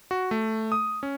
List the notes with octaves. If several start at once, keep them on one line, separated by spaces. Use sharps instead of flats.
F#4
A3
D#6
C#4